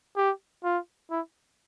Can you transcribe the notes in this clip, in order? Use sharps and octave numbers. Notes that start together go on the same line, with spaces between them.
G4
F4
E4